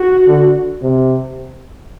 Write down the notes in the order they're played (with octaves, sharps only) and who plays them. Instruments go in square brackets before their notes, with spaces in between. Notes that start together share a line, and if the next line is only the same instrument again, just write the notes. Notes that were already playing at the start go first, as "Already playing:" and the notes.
Already playing: [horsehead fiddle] F#4
[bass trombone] D3
C3